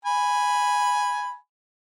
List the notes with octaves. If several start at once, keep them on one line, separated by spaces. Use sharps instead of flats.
G#5 B5